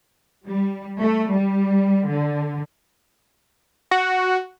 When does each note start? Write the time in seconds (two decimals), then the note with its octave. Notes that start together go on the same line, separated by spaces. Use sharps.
0.48 G3
1.01 A3
1.32 G3
2.08 D3
3.91 F#4